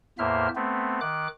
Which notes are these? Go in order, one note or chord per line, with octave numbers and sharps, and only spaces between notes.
E2 A2 A#3 C5 E5 F6
A3 B3 C4
D#3 D6 F#6